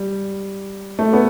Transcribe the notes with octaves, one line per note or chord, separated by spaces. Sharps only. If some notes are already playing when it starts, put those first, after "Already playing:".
Already playing: G3
A3
B3